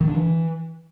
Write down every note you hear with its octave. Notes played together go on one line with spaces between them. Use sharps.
D#3
D4
E3